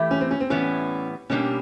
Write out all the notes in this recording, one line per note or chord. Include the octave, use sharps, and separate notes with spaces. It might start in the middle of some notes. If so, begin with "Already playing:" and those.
Already playing: E3 A3 E4 G4
C#4
C4
C#4
C4
A2 E3 G3 B3 C#4
B2 G3 A#3 C#4 D4 G4